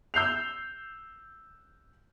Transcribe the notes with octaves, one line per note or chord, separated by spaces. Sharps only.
E6 G6 C7 F7